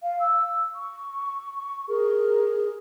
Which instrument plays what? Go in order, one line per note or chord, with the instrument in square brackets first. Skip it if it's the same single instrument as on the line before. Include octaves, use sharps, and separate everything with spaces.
[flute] F5
E6
C#6
[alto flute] G#4 [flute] A#4